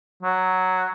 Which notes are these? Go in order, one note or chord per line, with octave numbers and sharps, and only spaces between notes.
F#3